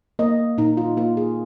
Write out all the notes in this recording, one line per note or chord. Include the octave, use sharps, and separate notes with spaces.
A#3 D#5
A#2 D#4
F4
A#3 F4
G#4